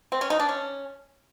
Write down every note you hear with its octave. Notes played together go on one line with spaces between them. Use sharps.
C4
C#4
D#4
D4
C#4